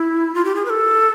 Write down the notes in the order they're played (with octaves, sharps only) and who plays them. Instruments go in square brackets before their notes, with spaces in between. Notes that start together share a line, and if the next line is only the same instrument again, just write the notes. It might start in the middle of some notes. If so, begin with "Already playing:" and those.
Already playing: [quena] E4
F4
G4
G#4
B4
A4